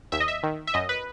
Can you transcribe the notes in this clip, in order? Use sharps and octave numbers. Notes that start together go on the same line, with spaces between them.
D#2 E5
D#5
E5
D#3
E5
F#2 D#5
B4